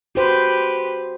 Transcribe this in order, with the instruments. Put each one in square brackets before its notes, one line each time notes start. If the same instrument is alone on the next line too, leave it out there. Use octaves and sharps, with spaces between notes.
[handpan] F#4 C5 [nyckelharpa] G4 B4